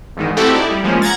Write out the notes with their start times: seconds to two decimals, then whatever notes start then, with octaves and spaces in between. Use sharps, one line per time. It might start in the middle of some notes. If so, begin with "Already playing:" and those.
0.17 E2 G#2 D#3
0.37 A3 C4 E4 F#4 G4 A4
0.52 D#4 E4 D5
0.70 G3
0.84 F3 G#3 A#3 C#4
1.02 F#5 A#5 G#6 A6